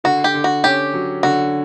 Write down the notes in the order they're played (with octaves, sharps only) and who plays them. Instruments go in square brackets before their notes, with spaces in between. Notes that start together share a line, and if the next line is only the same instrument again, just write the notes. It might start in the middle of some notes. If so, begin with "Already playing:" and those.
[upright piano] D3 [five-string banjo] F#4
[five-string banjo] G4
[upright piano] D3
[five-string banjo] F#4
[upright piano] C#4 [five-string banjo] G4
[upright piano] F#3
[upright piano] D3 [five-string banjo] F#4